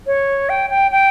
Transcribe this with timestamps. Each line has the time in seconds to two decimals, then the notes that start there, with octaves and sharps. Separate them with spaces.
0.07 C#5
0.49 G5
0.70 G5
0.91 G5